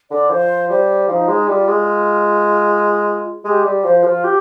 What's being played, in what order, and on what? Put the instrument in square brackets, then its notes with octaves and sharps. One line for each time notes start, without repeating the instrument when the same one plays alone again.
[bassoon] D3 [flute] D5
[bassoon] F3 [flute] C5
[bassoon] G3 [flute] C5
[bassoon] F3 [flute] D#4
[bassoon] G#3
[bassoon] G3 [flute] F4
[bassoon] G#3
[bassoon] G#3 [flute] G4
[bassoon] G3
[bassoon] F3 [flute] C5
[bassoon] F3 [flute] F4
[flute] G4